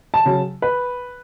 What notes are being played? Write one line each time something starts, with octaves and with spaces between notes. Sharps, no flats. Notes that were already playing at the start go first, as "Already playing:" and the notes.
A5
C#3 F#3
B4